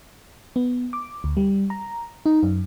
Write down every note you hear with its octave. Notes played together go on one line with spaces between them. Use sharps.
B3
D6
D2
G3
A#5
D#4
F#2